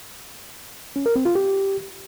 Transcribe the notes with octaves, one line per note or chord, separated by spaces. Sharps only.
C#4
A#4
C4
F4
G4